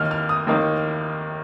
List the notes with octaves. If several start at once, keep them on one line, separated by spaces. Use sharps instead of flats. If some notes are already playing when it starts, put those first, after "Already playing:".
Already playing: D#2 D#3 A#3 D#4 F6
F6
D#6
D#2 D#3 A#3 D#4